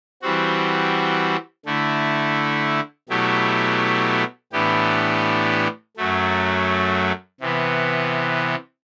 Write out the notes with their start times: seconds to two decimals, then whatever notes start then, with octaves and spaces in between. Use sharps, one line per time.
0.22 E3 G3 C4 F#4
1.66 D3 A3 E4
3.09 B2 F#3 A3 E4 G4
4.52 A2 E3 B3 D4 G4
5.97 F#2 F#3 A3
7.41 C3 E3 B3